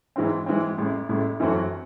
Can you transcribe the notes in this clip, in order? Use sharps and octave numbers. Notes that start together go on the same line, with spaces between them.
G#2 E3 G#3 C4
G#2 E3 G#3 C4
A1 A2 G#3
A1 A2 G#3
F#2 E3 A3 C4 F#4